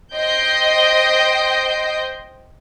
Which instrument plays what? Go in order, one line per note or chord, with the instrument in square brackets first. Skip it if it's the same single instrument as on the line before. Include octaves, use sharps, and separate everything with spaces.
[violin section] C5 D#5 G5 G6 A#6 C7